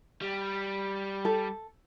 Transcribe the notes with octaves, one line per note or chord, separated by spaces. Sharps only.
G3
A4